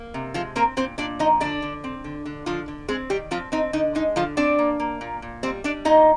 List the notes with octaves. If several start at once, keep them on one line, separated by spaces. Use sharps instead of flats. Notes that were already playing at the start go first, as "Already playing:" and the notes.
Already playing: A#3
C3
F3 G#3 F4
A#3 C4 A#4
A#2 C4 C5
A#2 D4 D5
F3 D#4 D#5
D3 D4 D5
D3
C4
D3
D3
D3 F3 F4
D3
G#3 C4 G#4
D#3 G3 G4
F3 C4 F4
C4 D#4
D3 D#4
G#3 D#4
D3 F3 F4
C4 D4 D5
A#3
A#3
A#2
A#2
G3 C4 C5
G3 D4 D5
A#2 D#4 D#5